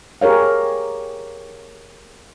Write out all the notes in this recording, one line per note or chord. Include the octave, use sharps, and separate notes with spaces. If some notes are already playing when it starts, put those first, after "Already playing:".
G4 G#4 A#4 C#5 F5